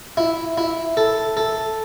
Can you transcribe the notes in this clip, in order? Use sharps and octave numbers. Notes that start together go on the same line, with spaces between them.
E4
E4
A4
A4